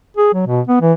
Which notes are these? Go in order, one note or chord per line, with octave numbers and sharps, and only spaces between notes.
G#4
F#3
B2
B3
E3